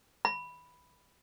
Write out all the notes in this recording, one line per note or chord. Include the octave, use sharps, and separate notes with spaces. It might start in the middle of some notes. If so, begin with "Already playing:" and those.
B5